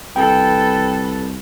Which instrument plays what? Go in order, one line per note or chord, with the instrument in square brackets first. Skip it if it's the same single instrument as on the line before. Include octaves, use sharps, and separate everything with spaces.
[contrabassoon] C2 [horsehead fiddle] A4 B4 [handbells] G5